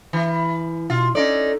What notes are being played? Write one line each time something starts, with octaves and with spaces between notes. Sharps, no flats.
E3 B5
B2 F4
C#4 D#4 A4 D5